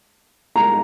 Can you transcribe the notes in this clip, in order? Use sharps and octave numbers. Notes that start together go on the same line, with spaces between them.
A#5